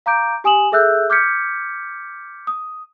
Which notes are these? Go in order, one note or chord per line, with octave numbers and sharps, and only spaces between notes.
F5 A#5 D6 G6 D7
G4 G#5 D#6 E7 F#7
G#4 A4 E5 E6 F#6 G6
D6 F6 G6 G#6 B6 C#7
D#6